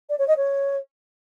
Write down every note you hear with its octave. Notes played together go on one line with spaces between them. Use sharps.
D5
C#5
D#5
C#5